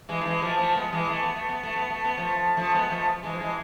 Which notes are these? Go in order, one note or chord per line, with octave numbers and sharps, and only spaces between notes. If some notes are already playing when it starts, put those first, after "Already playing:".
E3 G#3
A3
E3 G#3
F3 A3
F3 A3
G#3 B3
E3 G#3
A3
B3
A3
B3
A3
B3
A3
B3
F3 A3
F3 A3
G#3 B3
F3 A3
E3 G#3
F3
E3 G#3